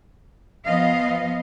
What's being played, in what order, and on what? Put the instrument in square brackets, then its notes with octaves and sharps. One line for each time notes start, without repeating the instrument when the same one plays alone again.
[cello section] F3 B3 D#5 F5